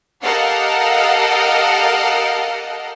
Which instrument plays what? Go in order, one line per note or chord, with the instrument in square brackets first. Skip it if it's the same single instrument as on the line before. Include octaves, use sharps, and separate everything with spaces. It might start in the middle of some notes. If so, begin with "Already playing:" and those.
[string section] G4 A4 A#4 D#5 F5 F#5